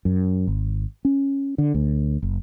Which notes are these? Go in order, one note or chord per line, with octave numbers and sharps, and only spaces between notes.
F#2
G#1
C#4
D3
D2
F#1